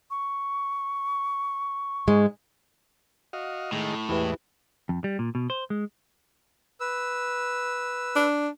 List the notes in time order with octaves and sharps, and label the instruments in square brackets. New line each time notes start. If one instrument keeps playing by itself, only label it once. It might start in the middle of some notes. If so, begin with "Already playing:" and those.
[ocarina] C#6
[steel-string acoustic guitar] G#2 G#3
[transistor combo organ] F#4 D#5 F5
[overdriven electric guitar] A2 [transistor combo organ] D#3 G#3 A3
[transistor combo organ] E2 E3 G#3 [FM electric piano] E4 G4 B4
[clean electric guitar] F2
G3
A#2
B2
C5
G#3
[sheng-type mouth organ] B4 E6
[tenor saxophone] D4